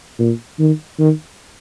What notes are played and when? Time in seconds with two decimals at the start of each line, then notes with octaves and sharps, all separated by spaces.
0.19 A#2
0.59 D#3
0.99 D#3